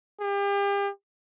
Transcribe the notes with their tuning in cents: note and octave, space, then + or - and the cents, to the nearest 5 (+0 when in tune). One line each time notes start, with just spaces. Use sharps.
G4 +40